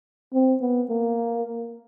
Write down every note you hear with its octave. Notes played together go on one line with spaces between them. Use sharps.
C4
B3
A#3